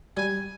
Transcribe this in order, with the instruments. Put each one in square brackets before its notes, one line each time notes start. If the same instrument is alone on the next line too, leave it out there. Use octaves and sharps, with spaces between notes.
[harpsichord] G3 [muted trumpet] G#5